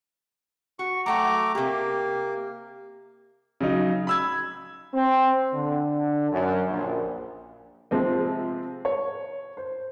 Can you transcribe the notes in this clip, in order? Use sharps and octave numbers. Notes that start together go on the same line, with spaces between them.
F#4 C#6
F#3 A3 F#5 G5 A#5 D6
C3 A#3 G4
C#3 F#3 D#4
B5 E6 G#6
C4
D3
F#2
A#1
C3 F3 G#3 C4
C#5
C5